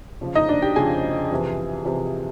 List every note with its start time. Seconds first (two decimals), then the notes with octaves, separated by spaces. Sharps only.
0.21 F2 C#3 F3
0.35 D#4 D#5
0.49 D4 D5
0.62 G4 G5
0.76 F2 C#3 F3 G#4 G#5
1.31 F2 C3 E3
1.85 F2 C3 E3